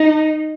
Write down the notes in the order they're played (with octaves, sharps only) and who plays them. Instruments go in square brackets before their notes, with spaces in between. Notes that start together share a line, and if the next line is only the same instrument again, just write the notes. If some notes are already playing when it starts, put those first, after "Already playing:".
Already playing: [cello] D#4